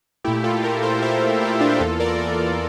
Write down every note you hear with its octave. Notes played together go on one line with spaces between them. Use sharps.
A#2 A3 E4 G4
F4 A4
G4 A#4
A4 C5
C5 E5
E4 G4
D4 F4
G4
E2 E3 A#3 F4 A4
A#4 D5
A#4 D5